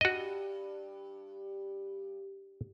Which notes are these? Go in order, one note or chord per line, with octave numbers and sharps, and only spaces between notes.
G2 F#4 D#5